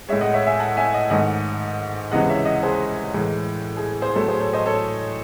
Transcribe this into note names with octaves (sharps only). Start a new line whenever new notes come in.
A2 G#3 C#5 E5
D#5 F#5
C#5 E5
E5 G#5
F#5 A5
E5 G#5
D#5 F#5
G#2 D#3 A3 D#5 F#5
C#2 C3 E3 G#3 D#5 F#5
C#5 E5
D#5 F#5
G#4 C5
A2 E3 G#3
G#4
G#4 C5
A2 F#3 A3 A4
G#4 C5
A4 C#5
C5 D#5
A4 C#5